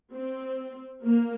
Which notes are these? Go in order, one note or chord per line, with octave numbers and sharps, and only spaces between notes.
C4
A#3